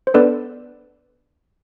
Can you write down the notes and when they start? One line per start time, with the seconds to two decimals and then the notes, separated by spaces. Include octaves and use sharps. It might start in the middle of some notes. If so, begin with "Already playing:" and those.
0.07 C5
0.14 B3 D4 A4 B4 D5